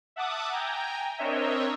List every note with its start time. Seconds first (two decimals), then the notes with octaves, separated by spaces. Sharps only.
0.16 E5 F#5 A5 D6 D#6
0.52 G5 G#5 A#5
1.18 C4 D4 A#4 C#5 D#5 E5